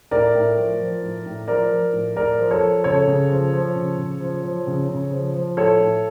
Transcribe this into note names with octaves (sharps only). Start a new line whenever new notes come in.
A2 A#4 D5
A2
F3
F3
A2
A2
F3 A#4 D5
F3
A2
A2 A#4 D5
F3
A4 C#5
F3
C#3 A4 C#5
C#3
F3
F3
C#3
C#3
F3
F3
C#3
C#3
F3
F3
A2 A4 C#5
A2